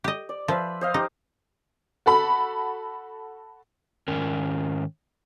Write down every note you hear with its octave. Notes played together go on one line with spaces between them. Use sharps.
G4 D#5
D5
F3 B4 C5 E5
C5 D#5 F5
D#4 G4
F#4 A4 B5
G#2 D#3 C#4 A#4